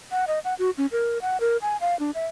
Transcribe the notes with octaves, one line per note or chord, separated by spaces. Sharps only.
F#5
D#5
F#5
F#4
C#4
A#4
F#5
A#4
G#5
F5
D4
E5